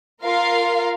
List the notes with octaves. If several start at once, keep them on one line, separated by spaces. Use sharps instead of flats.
F4 A#4 F5